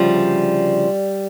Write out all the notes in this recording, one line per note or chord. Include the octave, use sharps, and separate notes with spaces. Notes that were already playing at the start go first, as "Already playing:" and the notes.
Already playing: D2 C#3 F3 G3